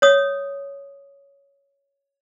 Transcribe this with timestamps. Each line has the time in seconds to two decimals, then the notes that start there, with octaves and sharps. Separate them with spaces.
0.02 C#5 D#6